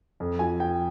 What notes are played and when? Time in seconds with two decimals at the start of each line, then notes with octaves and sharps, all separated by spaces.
0.20 F2
0.39 F3 G#5
0.60 F3 G5